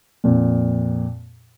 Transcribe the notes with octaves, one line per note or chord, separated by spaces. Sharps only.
F2 A#2